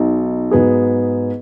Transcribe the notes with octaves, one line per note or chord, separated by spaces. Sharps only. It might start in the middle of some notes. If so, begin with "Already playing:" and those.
Already playing: B1 B2 F#3 D#4
G#2 F#3 B3 G#4